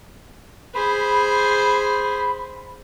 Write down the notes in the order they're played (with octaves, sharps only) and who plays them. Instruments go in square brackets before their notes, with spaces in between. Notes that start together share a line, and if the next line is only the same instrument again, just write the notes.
[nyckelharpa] G#4 C5 [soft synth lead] B5